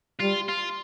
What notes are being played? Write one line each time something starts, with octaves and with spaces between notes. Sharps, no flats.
G3 F4
F4